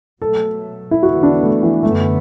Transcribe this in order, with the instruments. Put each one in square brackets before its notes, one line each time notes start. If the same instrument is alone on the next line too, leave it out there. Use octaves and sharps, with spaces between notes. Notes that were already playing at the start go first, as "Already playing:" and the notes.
[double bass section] B2 F#3 A3 [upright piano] A4
[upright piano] E4
[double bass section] E2 D3 B3 [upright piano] F#4
[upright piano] D4
A3
E3
[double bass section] F#2 D3 B3 [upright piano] A3